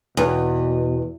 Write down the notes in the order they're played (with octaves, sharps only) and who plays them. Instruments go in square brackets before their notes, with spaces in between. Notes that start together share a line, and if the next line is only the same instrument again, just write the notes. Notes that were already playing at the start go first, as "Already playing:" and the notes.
[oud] E2 [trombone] B2